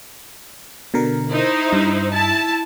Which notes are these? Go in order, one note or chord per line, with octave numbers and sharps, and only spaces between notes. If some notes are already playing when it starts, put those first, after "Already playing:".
B2 D3 A#4
D#4 E4 C5
G2
E4 A5